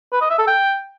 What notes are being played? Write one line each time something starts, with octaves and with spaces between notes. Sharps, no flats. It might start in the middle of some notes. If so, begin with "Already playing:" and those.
B4
D#5
E5
A4
G5